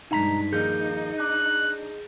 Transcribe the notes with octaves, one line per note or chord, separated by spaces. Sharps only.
B1 G2 G#3 D#4 A#5 B6
D#2 F3 A#3 D#4 G#4 G6
D4 F#6